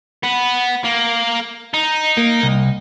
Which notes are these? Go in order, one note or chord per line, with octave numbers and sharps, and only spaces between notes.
B3
A#3
D#4
A#3
C2